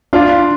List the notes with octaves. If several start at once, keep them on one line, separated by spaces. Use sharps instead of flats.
D4 F4